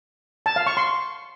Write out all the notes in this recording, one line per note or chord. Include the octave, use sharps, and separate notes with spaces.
A5
F5
C#6
C6